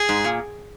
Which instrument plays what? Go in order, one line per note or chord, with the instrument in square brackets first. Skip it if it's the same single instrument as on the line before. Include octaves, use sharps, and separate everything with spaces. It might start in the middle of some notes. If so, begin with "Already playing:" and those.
Already playing: [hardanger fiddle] G#4
[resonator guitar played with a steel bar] G#2
A#2